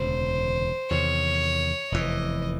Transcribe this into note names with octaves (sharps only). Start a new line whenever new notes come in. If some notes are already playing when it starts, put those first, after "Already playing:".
Already playing: E1 D2 C#3 E3 C5
E2 C3 D#3 C#5
F1 E2 C3 E3 D#5